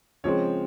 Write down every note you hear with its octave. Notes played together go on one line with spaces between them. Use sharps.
C#3 F3 G#3 C4 C#5